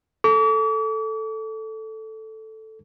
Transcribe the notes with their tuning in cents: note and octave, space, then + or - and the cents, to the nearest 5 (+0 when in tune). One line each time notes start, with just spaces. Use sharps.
A4 +0 D6 -45